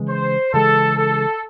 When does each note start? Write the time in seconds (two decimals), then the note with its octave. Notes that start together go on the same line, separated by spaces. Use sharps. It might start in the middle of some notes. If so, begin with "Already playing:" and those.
Already playing: C#3 E3 G#3
0.09 C5
0.53 C#3 E3 G#3 A4
0.98 A4